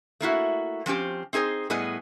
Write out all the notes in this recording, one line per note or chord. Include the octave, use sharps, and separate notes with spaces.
A3 A#3 E4 F#4
F3 C4 C#4 G4 C5
C4 D#4 G#4 A4 C5
A2 G3 B3 G#4 B4 D#5